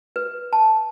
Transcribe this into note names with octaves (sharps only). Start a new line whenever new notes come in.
B4
A5